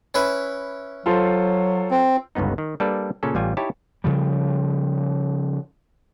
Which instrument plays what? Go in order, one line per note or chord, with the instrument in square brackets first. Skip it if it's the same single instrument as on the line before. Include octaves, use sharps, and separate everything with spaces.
[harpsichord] C#4 E4 B4
[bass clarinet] F#3 [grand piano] F4 A4 C5
[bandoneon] C4
[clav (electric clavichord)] G1 C#2 G2 B3 D#4
D#3
G3 A#3 D4 A4 B4 D5
A#2 C#3 C#4 A4
A1 G3 F4 G#5
D#4 E4 G4 C#5 A5
[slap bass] C#3 F3 G3